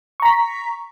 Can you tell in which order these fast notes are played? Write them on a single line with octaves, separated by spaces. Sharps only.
C#6 A#5 B6